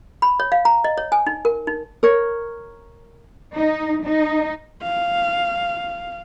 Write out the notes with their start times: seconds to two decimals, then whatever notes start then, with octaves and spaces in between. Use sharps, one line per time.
0.22 B5
0.40 C#5
0.52 F5
0.65 A#5
0.84 D#5
0.98 C#5
1.12 G#5
1.26 D#4
1.45 A#4
1.67 D#4
2.03 A#4 C#5
3.56 D#4
4.05 D#4
4.82 F5